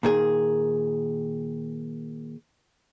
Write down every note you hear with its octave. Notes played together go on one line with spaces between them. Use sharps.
A#2 D#3 G#4